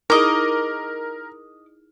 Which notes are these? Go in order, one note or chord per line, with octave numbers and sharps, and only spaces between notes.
D#4 E4 G#4 A#4 D#5 D6